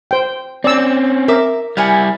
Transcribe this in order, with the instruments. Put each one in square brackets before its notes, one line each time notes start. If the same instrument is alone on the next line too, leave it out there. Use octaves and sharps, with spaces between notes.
[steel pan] C5 G5
[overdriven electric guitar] C4 C#4 [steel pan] D5 E6
[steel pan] A#4 [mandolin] E5 D6 E6
[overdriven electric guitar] G3 E4 [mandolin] F#5 G#5 F6